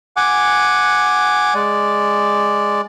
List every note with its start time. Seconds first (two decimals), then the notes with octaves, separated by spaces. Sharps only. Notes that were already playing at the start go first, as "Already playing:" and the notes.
0.17 F#5 G#5 D6
1.54 G#3 D5